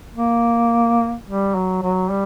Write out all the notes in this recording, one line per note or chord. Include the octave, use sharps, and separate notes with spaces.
A#3
G3
F#3
F#3
G3